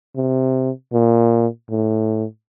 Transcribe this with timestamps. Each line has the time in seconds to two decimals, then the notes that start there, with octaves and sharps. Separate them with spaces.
0.16 C3
0.93 A#2
1.70 A2